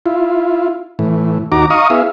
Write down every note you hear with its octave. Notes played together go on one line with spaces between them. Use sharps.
E4 F4
A2 E3
D#2 D#4 F#4 A#5 D6
D#5 F5 A#5 C#6 D#6
B3 E4 G#4 E5 F5